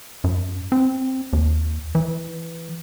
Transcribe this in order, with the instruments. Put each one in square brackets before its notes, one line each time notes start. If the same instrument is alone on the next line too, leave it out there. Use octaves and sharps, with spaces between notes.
[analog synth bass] F#2
C4
D#2
E3